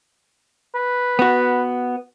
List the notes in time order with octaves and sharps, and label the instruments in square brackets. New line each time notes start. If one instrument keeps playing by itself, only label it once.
[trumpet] B4
[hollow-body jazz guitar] B3 F#4